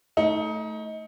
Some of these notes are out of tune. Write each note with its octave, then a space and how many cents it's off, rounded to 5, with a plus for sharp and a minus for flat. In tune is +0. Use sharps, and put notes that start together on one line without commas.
A3 +0 D#4 +25